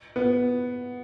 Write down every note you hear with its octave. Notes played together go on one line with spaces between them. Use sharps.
B3